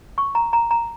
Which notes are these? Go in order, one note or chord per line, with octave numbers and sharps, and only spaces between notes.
C#6
A#5
A#5
A#5